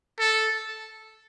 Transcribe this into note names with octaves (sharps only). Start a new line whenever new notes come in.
A4